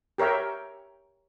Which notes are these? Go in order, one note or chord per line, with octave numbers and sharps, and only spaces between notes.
G4 A#4 C#5 E5 G5